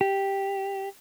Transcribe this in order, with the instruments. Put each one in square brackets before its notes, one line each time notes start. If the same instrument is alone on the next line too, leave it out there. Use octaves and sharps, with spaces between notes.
[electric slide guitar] G4